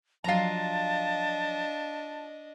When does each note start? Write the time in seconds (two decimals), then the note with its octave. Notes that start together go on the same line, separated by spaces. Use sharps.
0.24 F3 F#3 D4 F4 D#5 A5 A#5